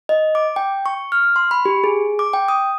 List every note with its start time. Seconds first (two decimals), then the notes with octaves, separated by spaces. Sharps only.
0.09 D#5
0.35 D6
0.56 G5
0.86 C#6
1.12 F6
1.36 C6
1.51 B5
1.65 G4
1.84 G#4
2.19 D6
2.33 G5
2.48 D#6